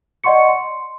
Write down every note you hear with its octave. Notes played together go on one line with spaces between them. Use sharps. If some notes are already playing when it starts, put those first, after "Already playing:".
D5 D#5 F#5 C6 C#6 C#7
C6